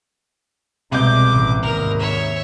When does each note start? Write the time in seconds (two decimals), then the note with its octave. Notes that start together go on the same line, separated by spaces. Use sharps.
0.91 C2 B2 G#3 D6 G6
1.31 A1
1.62 D#2 G#2 A#4
1.99 C#5 E5